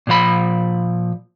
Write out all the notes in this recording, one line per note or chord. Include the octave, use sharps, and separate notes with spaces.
A#2 F3 B5